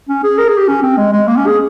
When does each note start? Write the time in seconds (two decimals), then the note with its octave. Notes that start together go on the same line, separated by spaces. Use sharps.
0.09 C#4
0.24 G#4
0.38 A#4
0.48 G#4
0.58 G4
0.68 C#4
0.83 C4
0.97 G#3
1.12 G#3
1.28 A#3
1.37 C#4
1.47 G#4